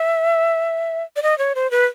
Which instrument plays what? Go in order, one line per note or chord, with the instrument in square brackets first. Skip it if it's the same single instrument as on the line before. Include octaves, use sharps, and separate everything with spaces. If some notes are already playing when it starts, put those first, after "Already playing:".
Already playing: [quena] E5
D5
D#5
C#5
C5
B4